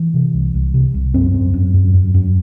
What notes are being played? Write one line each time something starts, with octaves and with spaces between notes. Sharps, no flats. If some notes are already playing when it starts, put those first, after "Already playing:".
Already playing: E3
C3
C2
C2
C3
C2
F#2 C4
F#2
F#2
F#2
F#2
F#2